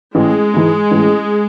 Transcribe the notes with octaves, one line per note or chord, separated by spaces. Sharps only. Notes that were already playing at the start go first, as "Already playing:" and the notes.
A1 G#3
G#2 E3
A1